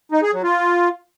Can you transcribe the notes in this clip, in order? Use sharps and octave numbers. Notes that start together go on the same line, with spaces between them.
D#4
G#4
F#3
F4